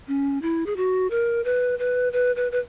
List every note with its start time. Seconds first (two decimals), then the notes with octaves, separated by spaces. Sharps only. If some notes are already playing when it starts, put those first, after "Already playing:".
0.08 C#4
0.42 E4
0.66 G#4
0.77 F#4
1.11 A#4
1.45 B4
1.79 B4
2.13 B4
2.36 B4
2.52 B4